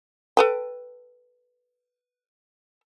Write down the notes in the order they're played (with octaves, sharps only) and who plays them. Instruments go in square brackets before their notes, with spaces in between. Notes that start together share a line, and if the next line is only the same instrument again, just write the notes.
[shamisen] A4 B4 G5